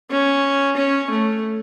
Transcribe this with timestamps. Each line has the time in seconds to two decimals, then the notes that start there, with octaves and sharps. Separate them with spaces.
0.10 C#4
0.77 C#4
1.10 A3